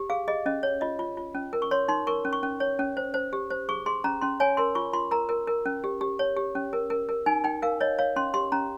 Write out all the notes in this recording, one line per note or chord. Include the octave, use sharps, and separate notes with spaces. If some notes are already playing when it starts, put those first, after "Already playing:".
Already playing: G4
G#4 F5
G#4 D#5
C#4 D#5
C#5
F4 D#5
F4
F4
C#4
A#4
C#6
C#5 C6
D#4 C6
A#4 C#6
C#4
C#6
C#4
C#5
C#4
C5
C5
G4
C5
G#4 C#6
G#4 C6
C#4 A#5
C#4 C6
C#5 G#5
A#4 C6
F4 C#6
F4 C6
A#4 A#5
A#4
A#4
C#4
G4
G4
C#5
G4
C#4
A#4
A#4
A#4
D#4 G#5
D#4 G5
A#4 F5
C#5 D#5
C#5 F5
C#4 C6
G4 C6
C#4 A#5